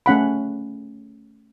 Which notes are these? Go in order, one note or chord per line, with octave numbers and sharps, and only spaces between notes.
A3 C#4 F#5 B5